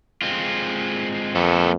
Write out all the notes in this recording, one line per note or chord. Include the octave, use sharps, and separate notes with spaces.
G#3 C4 F4
F2 A#3 B3 A4